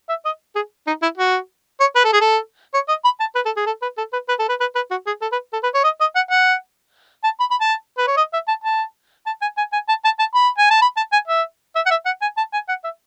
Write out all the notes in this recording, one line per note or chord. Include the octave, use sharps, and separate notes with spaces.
E5
D#5
G#4
D#4
E4
F#4
C#5
B4
A4
G#4
A4
C#5
D#5
B5
A5
B4
A4
G#4
A4
B4
A4
B4
B4
A4
B4
B4
B4
F#4
G#4
A4
B4
A4
B4
C#5
D#5
D#5
F#5
F#5
A5
B5
B5
A5
B4
C#5
D#5
E5
A5
A5
A5
G#5
G#5
G#5
A5
A5
A5
B5
G#5
A5
B5
A5
G#5
E5
E5
F#5
E5
F#5
G#5
A5
G#5
F#5
E5